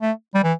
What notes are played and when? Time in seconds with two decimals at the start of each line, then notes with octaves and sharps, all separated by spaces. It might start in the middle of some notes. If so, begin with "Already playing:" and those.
0.02 A3
0.35 G3
0.44 E3